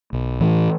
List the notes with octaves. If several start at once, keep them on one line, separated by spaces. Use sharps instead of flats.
B1
A2 E3 A3